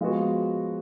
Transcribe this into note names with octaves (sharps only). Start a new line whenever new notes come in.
F3 G#3 B3 F#4